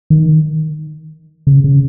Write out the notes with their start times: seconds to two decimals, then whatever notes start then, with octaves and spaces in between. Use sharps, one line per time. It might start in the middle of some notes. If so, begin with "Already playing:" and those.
0.10 D#3
1.47 C#3
1.64 C#3